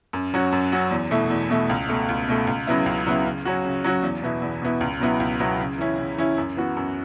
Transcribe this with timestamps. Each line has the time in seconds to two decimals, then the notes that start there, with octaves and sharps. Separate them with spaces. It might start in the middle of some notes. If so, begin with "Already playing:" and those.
0.13 F#2
0.34 F#3 C#4 F#4
0.52 F#2
0.72 F#3 C#4 F#4
0.91 E2
1.11 B2 A3 E4
1.30 E2
1.50 B2 A3 E4
1.69 C#2
1.89 B2 A3
2.09 C#2
2.29 B2 A3
2.47 C#2
2.67 C#3 F#3 B3 E4
2.86 C#2
3.06 C#3 F#3 B3 E4
3.25 C#3
3.45 F#3 C#4 F#4
3.65 C#3
3.84 F#3 C#4 F#4
4.03 E2
4.22 B2 B3 E4
4.42 E2
4.62 B2 B3 E4
4.81 C#2
5.00 B2 F#3 B3 E4
5.20 C#2
5.39 B2 F#3 B3 E4
5.60 C#3
5.78 E3 C#4 E4
5.98 C#3
6.17 E3 C#4 E4
6.38 F#2
6.57 E3 B3 F#4
6.77 F#2